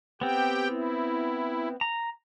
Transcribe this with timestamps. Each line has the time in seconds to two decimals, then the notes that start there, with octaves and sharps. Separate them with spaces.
0.21 B3 C4 G4 G5
0.69 E4
1.81 A#5